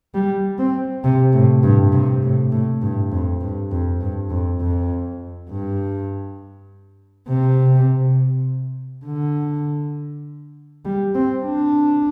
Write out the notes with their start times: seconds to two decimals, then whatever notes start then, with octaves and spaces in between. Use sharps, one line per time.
0.14 G3
0.59 C4
1.04 C3
1.33 A2
1.63 G2
1.93 C3
2.23 A2
2.52 A2
2.82 G2
3.12 F2
3.41 G2
3.71 F2
4.01 G2
4.30 F2
4.61 F2
5.50 G2
7.28 C3
9.06 D3
10.85 G3
11.15 C4
11.44 D4